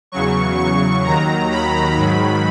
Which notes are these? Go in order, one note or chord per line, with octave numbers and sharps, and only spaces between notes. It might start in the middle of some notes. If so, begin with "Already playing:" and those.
E2 C#3 F#3 C#6
C#6
D#2 D#3 F#3 A#5
B5
G#2 D#3 F#3